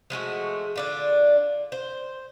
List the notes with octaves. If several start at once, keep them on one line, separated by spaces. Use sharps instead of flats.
F3 G#3 A3 F#4
D3 D4 F4
C5